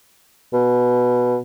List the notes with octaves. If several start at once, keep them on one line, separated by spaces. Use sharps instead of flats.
B2